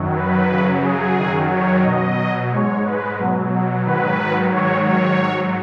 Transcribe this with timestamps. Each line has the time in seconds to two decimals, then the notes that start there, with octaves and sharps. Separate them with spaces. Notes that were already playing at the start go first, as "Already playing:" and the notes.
Already playing: F#2 D#3 F#3
0.16 B4
0.50 F#2 C#3 F#3
0.83 G#4
1.16 F#2 D#3 F#3
1.50 C#5
1.84 B2 F#3 D#5
2.51 G#2 G#3 C#5
2.84 B4
3.18 B2 F#3
3.85 G#2 D#3 F#3 B4
4.52 G#2 D#3 F#3 C#5
4.86 C#5
5.19 G#2 F#3